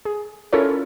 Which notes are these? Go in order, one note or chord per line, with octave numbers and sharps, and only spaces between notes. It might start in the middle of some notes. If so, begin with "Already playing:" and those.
G#4
C#4 E4 F4 A4 A#4 C#5